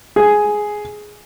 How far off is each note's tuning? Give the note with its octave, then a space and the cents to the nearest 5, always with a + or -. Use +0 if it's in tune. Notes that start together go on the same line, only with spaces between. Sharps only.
G#4 +5